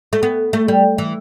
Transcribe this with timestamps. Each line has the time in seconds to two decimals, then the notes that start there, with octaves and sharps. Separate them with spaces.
0.13 A3
0.23 B3
0.53 A3
0.68 G3
0.98 E3